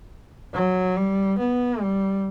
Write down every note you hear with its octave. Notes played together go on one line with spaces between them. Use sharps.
F#3
G3
B3
G3